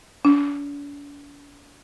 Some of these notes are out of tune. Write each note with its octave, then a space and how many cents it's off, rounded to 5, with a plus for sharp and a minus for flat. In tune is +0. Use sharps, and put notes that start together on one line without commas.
D4 -45